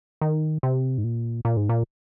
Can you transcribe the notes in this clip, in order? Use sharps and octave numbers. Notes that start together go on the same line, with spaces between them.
D#3
C3
G#2
A#2
A#2
G#2
A#2